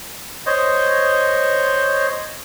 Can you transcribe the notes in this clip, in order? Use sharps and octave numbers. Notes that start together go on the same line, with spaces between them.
C5 C#5 D#5